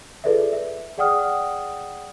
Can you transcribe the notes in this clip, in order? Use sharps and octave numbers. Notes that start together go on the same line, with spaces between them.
F4 G#4 A4 B4 D5 E5
E5
G#4 D5 F#5 G5 D#6 F6